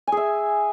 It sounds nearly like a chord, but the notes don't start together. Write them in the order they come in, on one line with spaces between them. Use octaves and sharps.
G#5 G#4 E5